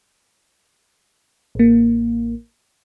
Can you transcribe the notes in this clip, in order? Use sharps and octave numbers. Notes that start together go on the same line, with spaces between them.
A1 A#3